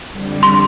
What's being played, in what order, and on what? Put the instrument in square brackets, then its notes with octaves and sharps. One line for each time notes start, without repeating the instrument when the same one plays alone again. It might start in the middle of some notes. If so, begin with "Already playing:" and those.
[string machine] F2 D3 G3
[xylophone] C6